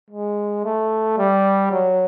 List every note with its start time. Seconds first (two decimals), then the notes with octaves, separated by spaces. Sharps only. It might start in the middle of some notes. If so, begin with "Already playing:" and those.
0.11 G#3
0.64 A3
1.18 G3
1.71 F#3